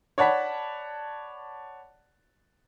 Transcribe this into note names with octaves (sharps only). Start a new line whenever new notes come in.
C#5 D5 F#5 A5 B5 B6